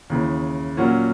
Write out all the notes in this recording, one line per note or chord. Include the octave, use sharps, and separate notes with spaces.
D#2 C#3 E3
A#2 F#3 A#3 C#4 F#4